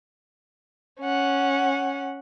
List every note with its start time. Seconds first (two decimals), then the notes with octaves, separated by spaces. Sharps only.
1.01 C#4 F#5